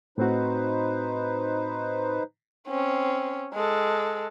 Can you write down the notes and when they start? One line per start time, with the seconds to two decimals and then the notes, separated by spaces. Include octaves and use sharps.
0.18 A2 C4 D#4 F#4 B4 C5
2.68 C4 C#4
3.53 G#3 A4